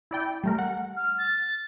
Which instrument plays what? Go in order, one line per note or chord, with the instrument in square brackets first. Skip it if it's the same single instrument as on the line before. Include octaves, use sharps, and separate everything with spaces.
[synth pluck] E4 D5 G5
G3 A3 A#4
F#5
[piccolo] F6
A6